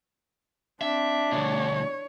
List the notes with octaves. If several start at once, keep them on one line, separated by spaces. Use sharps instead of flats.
C4 D4 E5
D2 B2 C#5